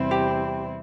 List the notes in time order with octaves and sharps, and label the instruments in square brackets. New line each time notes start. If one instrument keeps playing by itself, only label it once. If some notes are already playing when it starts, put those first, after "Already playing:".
Already playing: [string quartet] E2 C3 G3 C4 E4
[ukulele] G4